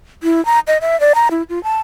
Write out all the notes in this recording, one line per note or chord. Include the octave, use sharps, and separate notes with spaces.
E4
A#5
D#5
E5
D5
A#5
E4
F4
A5